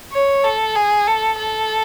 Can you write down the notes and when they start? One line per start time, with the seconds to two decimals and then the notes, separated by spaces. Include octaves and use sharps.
0.12 C#5
0.44 A4
0.76 G#4
1.07 A4
1.38 A4